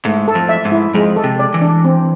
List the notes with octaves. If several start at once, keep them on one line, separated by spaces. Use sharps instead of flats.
G#2 A3
A4
F2
E5
G#2
E4
F2 G#3
A4
C3
D5
E3
D4
C4